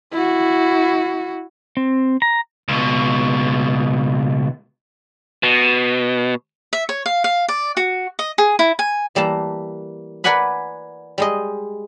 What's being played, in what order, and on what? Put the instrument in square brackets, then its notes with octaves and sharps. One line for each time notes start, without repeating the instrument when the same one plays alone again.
[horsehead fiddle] E4 F#4
[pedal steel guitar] C4
A#5
[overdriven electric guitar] C#2 B2
[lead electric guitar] B2
[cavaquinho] E5
C#5
F5
F5
D5
F#4
D#5
G#4
E4
G#5
[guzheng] E3 G3 A#3 A5 A#5
A#4 B4 D5 F#5 G#5 B5
G3 G#3 D#5